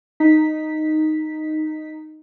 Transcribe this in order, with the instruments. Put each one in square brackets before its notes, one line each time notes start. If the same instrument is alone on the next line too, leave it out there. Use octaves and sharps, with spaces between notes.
[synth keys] D#4 B6